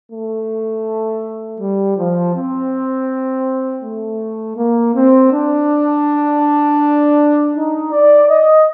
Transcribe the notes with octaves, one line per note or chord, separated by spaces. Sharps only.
A3
G3
F3
C4
A3
A#3
C4
D4
D#4
D5
D#5